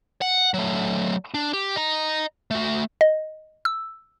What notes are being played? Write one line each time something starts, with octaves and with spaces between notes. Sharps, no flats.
F#5
F#3 A3
D4
G4
D#5 A#5
A3 F#4
D#5
E6